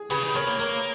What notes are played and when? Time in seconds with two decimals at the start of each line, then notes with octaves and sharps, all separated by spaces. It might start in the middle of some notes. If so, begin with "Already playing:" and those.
Already playing: G#4
0.10 C#3 G#4 B4
0.23 D#3
0.34 B3 A#4 C#5
0.47 A#3
0.58 A#3 A#4 C#5